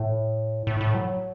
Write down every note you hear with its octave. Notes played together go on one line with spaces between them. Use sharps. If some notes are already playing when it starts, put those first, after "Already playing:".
Already playing: A2
A2
A2
F#3